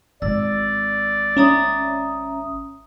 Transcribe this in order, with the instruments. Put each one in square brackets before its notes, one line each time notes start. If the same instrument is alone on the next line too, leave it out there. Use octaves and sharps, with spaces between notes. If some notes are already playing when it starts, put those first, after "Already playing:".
[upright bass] G#1 [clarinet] D5 [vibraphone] E6
[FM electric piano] C#4 [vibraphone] E5 A#5 D#6